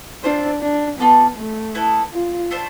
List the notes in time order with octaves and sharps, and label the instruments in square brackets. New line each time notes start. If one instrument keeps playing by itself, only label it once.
[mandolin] C4 F4 C5 [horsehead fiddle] D4
[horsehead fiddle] D4
[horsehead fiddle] B3 [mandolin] F4 A4 D5 A5
[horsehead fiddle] A3
[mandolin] B3 E4 A4
[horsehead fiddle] F4
[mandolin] A3 D4 F4 C5